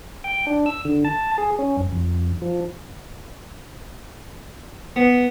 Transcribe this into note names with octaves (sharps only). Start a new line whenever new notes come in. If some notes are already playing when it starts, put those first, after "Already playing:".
G5
D4
E6
D3
A5
G#4
C#4
F#2
F2
F3
B3